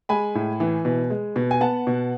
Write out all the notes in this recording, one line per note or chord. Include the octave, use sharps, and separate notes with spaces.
G#3 G#5 B5
A2
E3
B2
G#3
B2
G#5
B3 F#5 A5
B2